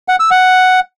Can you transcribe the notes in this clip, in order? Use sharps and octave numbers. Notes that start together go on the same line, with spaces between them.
F#5
E6
F#5